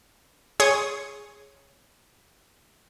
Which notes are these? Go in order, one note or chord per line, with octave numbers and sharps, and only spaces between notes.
G#4 C#5 C6 C#6 D#6